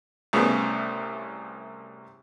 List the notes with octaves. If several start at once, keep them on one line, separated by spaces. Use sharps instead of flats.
C2 A2 C#3 B3